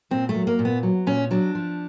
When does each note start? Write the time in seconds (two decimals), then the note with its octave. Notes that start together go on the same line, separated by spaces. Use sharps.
0.11 A#2 C4
0.29 A3
0.35 F#3
0.47 A#3
0.59 A#2
0.65 B3
0.83 F#3
1.07 A#2 C#4
1.31 F#3 D4
1.55 F3